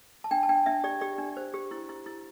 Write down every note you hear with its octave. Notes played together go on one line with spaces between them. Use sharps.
A5
D4 G5
A5
D4 G5
D4 E5
G4 D5
G4 D5
D4
C5
G4
E4
E4
E4